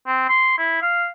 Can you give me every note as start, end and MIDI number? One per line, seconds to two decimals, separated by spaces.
0.07 0.28 60
0.29 0.53 84
0.58 0.80 64
0.82 1.07 77